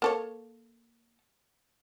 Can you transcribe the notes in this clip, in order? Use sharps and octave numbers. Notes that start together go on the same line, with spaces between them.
A#3 A4 C#5